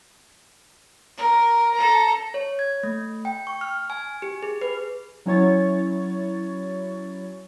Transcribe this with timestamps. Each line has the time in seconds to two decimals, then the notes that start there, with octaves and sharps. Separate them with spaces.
1.17 A#4
1.74 A4 A#5
2.34 C#5
2.59 G#6
2.83 A3
3.25 G5
3.47 C#6
3.61 F6
3.90 G#5
4.22 G4
4.43 G#4
4.61 B4
5.26 F#3 C#4 E4 C#5 C#6 A6